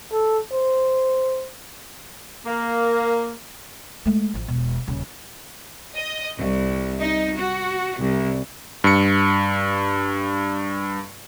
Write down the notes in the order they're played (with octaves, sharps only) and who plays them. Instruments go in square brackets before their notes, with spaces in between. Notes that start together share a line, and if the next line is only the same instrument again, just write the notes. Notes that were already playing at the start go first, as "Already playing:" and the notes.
[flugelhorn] A4
C5
[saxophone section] A#3
[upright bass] G#3 A3
A1 F3
E1 B2
D#1 C#3
[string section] D#5
C2
D#4
F#4
C2
[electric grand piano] G2 C#7